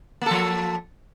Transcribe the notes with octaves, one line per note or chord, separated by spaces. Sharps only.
F3 A#3 A4